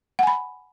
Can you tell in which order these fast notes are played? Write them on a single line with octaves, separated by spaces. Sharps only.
F#5 G#5 B5